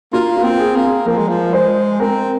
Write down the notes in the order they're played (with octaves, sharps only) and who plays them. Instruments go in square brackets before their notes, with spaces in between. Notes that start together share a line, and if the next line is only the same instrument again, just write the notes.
[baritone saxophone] A#3 [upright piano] F4
[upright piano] F4
[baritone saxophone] C4
[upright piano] G#4
[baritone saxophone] A#3
[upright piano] G#4
[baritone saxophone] F3 [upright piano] A#4
[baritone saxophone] G#3
F3
[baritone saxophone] G#3 [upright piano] C5
[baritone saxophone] C4 [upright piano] A#4